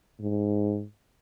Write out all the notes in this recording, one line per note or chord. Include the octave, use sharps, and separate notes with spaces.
G#2